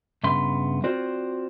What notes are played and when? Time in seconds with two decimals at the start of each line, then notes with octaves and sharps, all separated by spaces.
0.23 G2 C#3 B3 E5 B5 C6
0.84 C4 F4 F#4 C5 D5